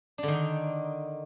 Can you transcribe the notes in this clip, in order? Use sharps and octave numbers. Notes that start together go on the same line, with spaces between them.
D3 D#3 D4 D#4